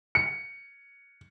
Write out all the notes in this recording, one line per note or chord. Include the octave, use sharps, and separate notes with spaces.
C#7